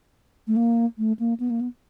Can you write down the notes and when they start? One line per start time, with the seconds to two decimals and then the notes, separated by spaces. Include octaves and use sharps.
0.47 A3
0.56 A#3
0.98 A3
1.19 A#3
1.40 B3
1.50 A#3
1.61 B3